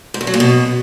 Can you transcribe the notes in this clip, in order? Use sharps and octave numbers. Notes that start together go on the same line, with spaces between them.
G#2
E2
F#3
A#2
B2